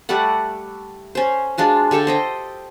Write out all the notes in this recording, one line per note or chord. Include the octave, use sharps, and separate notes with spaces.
G3 A3 D5 F#5
C#4 C5
G#3 D4 F4 F#4
D3 G4 A4 G5
C5 D#5 G5